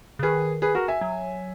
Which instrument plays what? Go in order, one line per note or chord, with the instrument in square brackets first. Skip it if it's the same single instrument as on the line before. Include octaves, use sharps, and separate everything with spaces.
[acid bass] C#3
[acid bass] D#3 [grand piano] G#4 B4
[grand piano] G#4 B4
F#4 A#4
E5 G#5
[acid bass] F#3